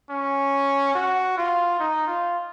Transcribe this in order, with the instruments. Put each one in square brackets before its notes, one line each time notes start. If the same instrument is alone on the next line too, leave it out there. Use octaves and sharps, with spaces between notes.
[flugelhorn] C#4
F#4
F4
D#4
F4